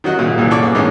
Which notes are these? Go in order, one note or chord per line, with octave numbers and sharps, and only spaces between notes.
D#3 F#3 F#4 D#5 F#5
A#2 C#3 A#3
C2 F#2 A#2 E3
G#4 A4 C#5 D5
A#3 B3
G#2 D#3 E3 G#3 C#4 D4